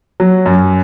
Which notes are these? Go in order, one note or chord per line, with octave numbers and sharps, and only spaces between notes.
F#3
F#2